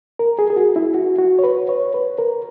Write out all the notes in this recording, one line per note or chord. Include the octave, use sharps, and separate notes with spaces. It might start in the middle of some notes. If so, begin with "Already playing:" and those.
A#4
G#4
G#4
F#4
E4
F#4
F#4
C#5
B4
C#5
B4
A#4